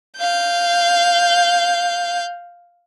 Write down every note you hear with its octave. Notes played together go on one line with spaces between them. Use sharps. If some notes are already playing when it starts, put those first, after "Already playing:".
F5 G6